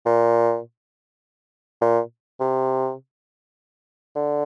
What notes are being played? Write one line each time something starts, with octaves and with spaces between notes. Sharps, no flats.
A#2
A#2
C3
D3